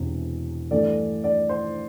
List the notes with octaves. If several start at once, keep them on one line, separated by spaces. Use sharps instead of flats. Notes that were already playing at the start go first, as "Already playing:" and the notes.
Already playing: E1 E2 C3 E3
G2 E3 A3 D5
D5
C5